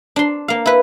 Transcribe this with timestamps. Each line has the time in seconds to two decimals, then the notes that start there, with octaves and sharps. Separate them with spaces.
0.16 D4 C6
0.48 A#3 F5
0.66 E4 B4